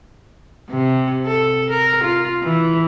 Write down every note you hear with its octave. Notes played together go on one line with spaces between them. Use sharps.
C3
A4
A#4
F4
E3